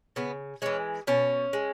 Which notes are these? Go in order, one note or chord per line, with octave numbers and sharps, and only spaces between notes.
C#3 B3
E3 G#3 C#4
B2 C#4
G#3